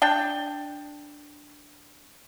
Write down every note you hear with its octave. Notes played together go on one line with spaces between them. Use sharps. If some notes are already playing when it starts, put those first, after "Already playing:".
D4 G5